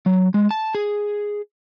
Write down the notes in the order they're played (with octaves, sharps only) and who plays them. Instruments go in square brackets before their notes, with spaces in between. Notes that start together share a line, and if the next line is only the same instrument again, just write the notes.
[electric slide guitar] F#3
G#3
A5
G#4